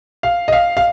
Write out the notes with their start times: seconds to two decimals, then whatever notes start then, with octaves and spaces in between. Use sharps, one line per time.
0.23 F5
0.48 D#5
0.52 F5
0.77 F5